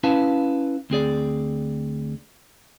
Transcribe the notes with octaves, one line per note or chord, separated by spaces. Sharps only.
C#4 E4 B4 F5 A5
D2 C4 G#4 D5